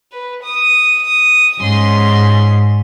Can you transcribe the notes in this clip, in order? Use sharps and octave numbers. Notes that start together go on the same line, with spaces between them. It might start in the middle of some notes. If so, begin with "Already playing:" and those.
B4
D#6
G#2 C#4 C6